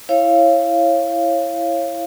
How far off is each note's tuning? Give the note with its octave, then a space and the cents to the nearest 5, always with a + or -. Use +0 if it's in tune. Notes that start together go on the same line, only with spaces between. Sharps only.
E4 +5 C#5 -20 F5 -20